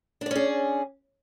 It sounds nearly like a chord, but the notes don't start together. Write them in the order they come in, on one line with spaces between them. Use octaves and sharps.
D4 D5 C#4 G#4